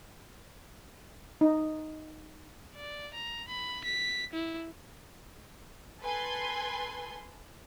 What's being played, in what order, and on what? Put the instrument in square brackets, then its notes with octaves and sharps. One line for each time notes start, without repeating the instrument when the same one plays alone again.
[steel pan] D#4
[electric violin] D5
A#5
B5
B6
E4
[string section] A4 B4 G#5 C6